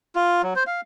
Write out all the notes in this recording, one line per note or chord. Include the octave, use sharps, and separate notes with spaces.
F4
F#3
C5
F5